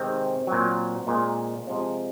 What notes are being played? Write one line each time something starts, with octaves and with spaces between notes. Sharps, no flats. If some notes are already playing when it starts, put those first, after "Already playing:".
Already playing: C3 D#3 G#3 C4
A#2 F#3
A#2 G#3
C3 F3 G#3